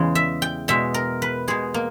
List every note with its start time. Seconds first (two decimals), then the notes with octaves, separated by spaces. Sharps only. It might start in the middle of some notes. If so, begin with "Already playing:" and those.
Already playing: E2 C#3 G#3
0.15 E5
0.42 G5
0.68 B2 G#3 E5
0.94 A#4
1.22 B4
1.48 B2 G#3 G#4
1.74 A#3